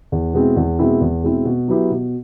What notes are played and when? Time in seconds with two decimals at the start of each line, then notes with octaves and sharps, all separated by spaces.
0.12 E2
0.34 B2 G#3 C4 E4
0.56 E2
0.79 B2 G#3 C4 E4
1.01 E2
1.23 B2 G#3 C4 E4
1.45 B2
1.68 F#3 B3 E4 G4
1.91 B2